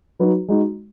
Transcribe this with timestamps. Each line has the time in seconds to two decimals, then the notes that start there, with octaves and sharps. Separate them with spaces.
0.19 F#3 D#4 F#4 B4
0.48 G#3 D#4 F#4